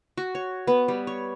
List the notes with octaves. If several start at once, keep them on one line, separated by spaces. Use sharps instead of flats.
F#4
C#5
B3
G3
C#5